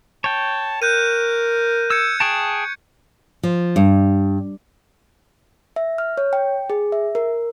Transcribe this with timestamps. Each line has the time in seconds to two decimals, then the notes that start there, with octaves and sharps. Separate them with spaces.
0.24 C#5 G5 A5
0.82 A#4 F#6 G6 D#7
1.90 E6 G6 G#6 C#7
2.20 G#4 G5 A5 C#6
3.43 F3
3.76 G2
5.76 E5
5.98 F6
6.17 C#5
6.33 G5
6.70 G#4
6.92 E5
7.15 A#4